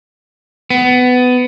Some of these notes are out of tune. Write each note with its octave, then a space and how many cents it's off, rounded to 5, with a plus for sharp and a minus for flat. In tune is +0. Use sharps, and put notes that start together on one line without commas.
B3 +20